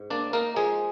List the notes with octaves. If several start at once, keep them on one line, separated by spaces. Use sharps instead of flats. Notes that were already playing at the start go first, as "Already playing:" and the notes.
Already playing: G#2
A#3 D4 D5
A#3 D#4 A#4
F3 G#3 G#4